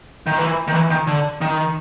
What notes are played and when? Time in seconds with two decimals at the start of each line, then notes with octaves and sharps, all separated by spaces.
0.27 D#3
0.38 E3
0.68 D#3
0.73 E3
0.90 D#3
1.07 D3
1.41 D#3